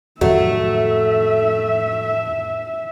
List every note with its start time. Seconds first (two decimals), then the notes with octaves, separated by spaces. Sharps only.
0.21 F2 A2 D#3 F#3 A3 E5